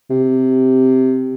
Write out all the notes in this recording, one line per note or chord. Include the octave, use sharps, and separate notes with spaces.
C3